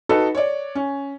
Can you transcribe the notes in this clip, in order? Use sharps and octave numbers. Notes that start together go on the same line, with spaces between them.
D#4 F#4 A4 B4
C#5 D5
C#4